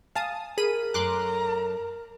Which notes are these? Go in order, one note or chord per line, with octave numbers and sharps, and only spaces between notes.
F5 G#5 A5 D#6
G#4 A#4 B5 D#7
F#2 A3 A#5 C6 D6 F#6